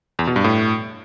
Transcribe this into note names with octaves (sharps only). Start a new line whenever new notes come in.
E2
B2
G2
A2